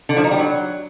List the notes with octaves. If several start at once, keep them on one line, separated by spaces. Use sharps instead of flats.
D3
F3
D#4
G3
F#3